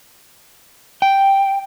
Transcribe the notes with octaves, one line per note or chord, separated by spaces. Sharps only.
G5